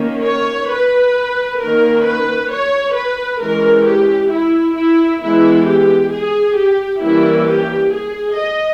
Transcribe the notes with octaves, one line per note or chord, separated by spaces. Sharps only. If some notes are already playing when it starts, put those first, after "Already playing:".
Already playing: D#3 A#3 C#4
C#5
B4
D#3 A#3 C#4 A#4
B4
C#5
B4
E3 G#3 C#4 A#4
G4
E4
E4
E3 G#3 B3 E4
G4
G#4
G4
E3 G3 A#3 C#4 E4
G4
G#4
D#5